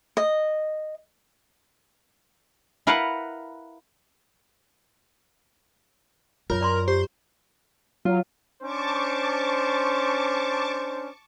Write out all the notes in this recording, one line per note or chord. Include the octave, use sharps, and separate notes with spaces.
D#5
E4 A#4 B4 F5 F#5
F#2 F4 A#4 C#5
D5 A#5 C6
G4 C5
F#3 F4
C#4 D4 C5 A5 C#6 D6